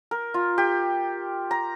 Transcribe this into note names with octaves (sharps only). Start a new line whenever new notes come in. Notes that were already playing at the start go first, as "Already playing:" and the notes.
A#4
F4
G4
A#5